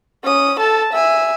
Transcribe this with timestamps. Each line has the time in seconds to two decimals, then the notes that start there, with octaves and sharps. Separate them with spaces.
0.23 C#4 D#6
0.59 A4 A5
0.93 E5 G#5